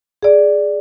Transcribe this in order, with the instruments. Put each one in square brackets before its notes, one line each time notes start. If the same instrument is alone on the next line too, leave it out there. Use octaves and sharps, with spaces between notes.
[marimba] G#4 D5